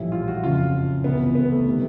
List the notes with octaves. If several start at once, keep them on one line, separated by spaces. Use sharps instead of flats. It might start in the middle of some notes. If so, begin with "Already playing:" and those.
Already playing: A#1 A2 E3 G3 E4
F4
F#4
F#1 F2 C#3 F4
C#2 C3 E3 B3
B3
A3
C3 D#3 G3